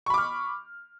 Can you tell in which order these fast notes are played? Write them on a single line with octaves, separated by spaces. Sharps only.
C#6 B5 D6 F6